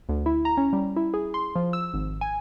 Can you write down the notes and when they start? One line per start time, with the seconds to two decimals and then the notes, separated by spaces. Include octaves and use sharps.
0.09 D2
0.26 E4
0.45 A#5
0.57 C#4
0.73 G3
0.96 E4
1.14 G#4
1.34 C6
1.56 F3
1.73 E6
1.94 G#1
2.21 G#5